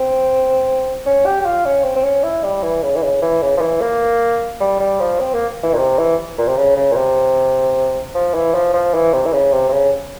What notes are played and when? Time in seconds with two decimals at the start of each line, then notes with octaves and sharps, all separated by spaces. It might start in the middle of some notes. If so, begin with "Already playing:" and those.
Already playing: C4
1.06 C#4
1.26 G4
1.41 G4
1.45 F4
1.65 C#4
1.84 C4
1.96 C4
2.04 C#4
2.23 E4
2.44 G3
2.63 E3
2.83 C#3
2.96 E3
3.03 C#3
3.22 E3
3.42 C#3
3.57 F3
3.61 E3
3.81 A#3
4.60 G3
4.80 G3
5.00 F3
5.20 C4
5.34 A#3
5.63 E3
5.74 A#2
5.78 C3
5.98 E3
6.38 A#2
6.48 C3
6.57 C#3
6.77 C#3
6.92 A#2
6.96 C3
8.15 F3
8.34 E3
8.54 F3
8.74 F3
8.94 E3
9.13 C3
9.26 E3
9.33 C#3
9.52 C3
9.69 C3
9.72 C#3